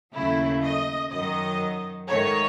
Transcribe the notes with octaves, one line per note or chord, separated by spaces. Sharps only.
D#2 C#3 F#3 A3 E4
D#5
F#2 D#3 F#3 D#5
G#2 D#3 A3 C#5